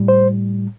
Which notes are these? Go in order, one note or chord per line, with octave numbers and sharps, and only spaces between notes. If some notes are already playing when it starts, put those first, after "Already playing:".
Already playing: A2 G3
C5